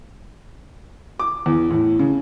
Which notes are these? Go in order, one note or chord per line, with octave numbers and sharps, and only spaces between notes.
D6
E2
A2
C#3